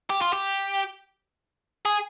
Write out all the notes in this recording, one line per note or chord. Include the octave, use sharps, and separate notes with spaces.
G4
F4
G4
G#4